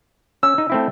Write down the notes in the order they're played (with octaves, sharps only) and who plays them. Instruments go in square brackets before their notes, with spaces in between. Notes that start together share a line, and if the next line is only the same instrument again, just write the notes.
[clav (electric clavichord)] C#4 [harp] E6
[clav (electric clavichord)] D#4
A3 C4 E4